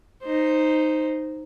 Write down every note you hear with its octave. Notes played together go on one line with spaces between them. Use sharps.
D#4 C5